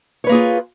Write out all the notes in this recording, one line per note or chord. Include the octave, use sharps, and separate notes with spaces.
A#3 F4 G#4 B4 C#5